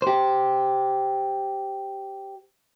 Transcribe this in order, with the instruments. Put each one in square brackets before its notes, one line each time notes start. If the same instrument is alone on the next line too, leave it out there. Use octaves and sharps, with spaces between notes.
[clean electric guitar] G4 C5